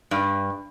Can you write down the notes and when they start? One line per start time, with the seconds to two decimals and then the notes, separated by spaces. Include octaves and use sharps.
0.11 G2